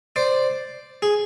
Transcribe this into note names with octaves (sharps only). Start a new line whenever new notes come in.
C5 D5
G#4